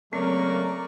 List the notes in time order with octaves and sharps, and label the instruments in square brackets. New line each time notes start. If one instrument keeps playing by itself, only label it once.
[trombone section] C#3 A3 A#3 [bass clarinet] F#3 [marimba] C4 [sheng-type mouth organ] A#4 D5 C#6